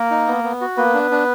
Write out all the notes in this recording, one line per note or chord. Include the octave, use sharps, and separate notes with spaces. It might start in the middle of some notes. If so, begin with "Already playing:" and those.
Already playing: A#3 A#4
D#4
B3
B3
F#4
A#3 B3 B4
D4
D4